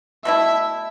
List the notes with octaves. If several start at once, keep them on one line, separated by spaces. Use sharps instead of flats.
B2 A3 E4 E5